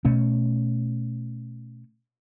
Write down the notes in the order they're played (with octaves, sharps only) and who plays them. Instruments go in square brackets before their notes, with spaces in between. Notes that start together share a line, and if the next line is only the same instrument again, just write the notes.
[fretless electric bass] B2 A3 C#4